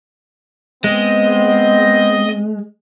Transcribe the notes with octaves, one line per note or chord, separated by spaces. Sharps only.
G#3 B3 C4 D#5